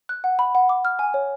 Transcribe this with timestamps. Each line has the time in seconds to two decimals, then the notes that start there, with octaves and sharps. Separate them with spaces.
0.09 F#6
0.24 F#5
0.39 B5
0.55 F#5
0.69 D6
0.85 F6
0.99 G#5
1.14 C#5